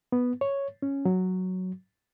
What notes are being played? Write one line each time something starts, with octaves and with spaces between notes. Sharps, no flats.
B3
C#5
C#4
F#3